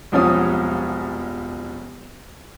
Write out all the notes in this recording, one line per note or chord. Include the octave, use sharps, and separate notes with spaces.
E1 C2 F3 C#4 C#5 D#6